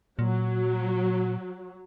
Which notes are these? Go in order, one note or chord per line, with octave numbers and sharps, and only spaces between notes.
A#2 F#3